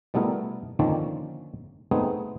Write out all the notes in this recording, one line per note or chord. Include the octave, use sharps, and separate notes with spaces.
B2 G3 A3 B3 E4 A#4
D3 D#3 F3 A#3 C4 C#4
G#3 A3 B3 C4 D#4 G#4